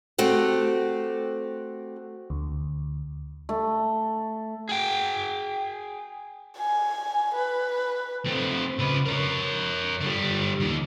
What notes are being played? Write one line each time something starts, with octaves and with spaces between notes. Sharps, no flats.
A3 C4 F#4 G4
D2
A3
G#4 G5
G#5
B4
A3 C4
C#3 B4
A#4 C#5
D3 G3
D#2 D#3